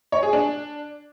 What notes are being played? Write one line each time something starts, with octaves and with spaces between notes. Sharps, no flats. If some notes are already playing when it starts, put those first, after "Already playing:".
C#5
G#4
D4